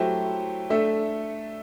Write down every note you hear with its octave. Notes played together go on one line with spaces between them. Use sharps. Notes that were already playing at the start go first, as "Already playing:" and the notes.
Already playing: F#3 A3 E4 G4 C5
A3 D4 A4 E5